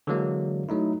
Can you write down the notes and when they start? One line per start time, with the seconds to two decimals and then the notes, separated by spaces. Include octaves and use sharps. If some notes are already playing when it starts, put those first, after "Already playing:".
0.07 D3 E3 F#3 G#3 A#3
0.69 F#3 A3 D#4 E4